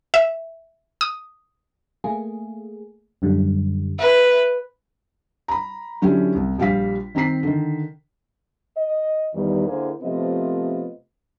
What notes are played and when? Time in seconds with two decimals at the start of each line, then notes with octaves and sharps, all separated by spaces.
0.14 E5
1.01 D#6
2.04 A3 A#3 G#4
3.22 F#2 D3 G3
3.99 B4 E5
5.48 A#5 B5
6.02 D3 F#3 C#4 D4 E4 G4
6.35 C2
6.58 A#1 G3 G4 F5 B6
7.15 D#3 C4 A#5 B6 C7
7.43 D3 D#3
8.76 D#5
9.34 E2 D#3 G3
9.66 D3 A#3 E4 G#4 C5
10.01 C3 F3 A3 B3 F4 D#5